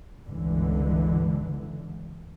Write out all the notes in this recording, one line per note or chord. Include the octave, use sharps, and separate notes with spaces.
G1 C#2 D3 E3